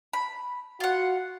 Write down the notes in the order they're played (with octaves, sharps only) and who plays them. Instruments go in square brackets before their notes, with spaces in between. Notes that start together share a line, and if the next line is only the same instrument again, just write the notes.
[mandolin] B5
[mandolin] F4 F#5 [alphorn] F#4